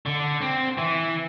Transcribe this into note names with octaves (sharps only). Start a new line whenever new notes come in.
D3
C4
E3